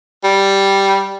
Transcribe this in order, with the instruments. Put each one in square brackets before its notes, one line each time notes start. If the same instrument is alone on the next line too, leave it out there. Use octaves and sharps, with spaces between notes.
[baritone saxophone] G3